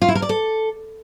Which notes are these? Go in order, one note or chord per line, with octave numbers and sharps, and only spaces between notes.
F4
E4
A#4
D5
A4